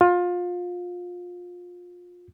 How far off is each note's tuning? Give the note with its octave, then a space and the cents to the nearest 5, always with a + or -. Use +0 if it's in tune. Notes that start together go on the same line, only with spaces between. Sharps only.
F4 +25